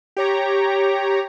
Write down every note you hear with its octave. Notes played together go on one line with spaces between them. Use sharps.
G4 C#5 A#5